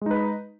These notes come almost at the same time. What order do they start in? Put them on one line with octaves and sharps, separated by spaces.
G#3 D#4 B4